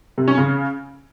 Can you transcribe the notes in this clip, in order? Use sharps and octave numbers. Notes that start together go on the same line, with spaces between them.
C3
C#4
C#3